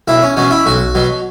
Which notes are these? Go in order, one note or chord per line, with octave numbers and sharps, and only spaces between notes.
B1 E4
C#4
B2 F#3 C#4
E4
B1 F#4
B2 F#3